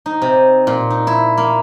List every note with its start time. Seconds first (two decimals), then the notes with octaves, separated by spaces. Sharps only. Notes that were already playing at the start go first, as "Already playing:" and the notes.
0.06 D#4
0.22 C3
0.67 A#2
0.90 D#4
1.07 E4
1.38 A#3